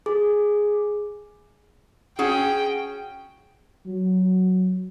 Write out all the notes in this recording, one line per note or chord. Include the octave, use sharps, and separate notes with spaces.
G#4
C#4 F#4 G#4 G5
F#3